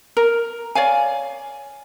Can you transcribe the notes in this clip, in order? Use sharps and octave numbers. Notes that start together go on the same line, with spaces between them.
A#4
C#5 D5 F5 G#5